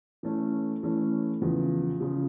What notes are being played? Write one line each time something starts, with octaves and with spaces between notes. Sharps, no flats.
E3 A3 C#4
E3 A3 C#4
E2 C#3 F3
C#3 F3